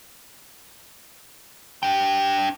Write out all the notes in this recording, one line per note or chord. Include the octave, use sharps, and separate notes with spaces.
D4 G5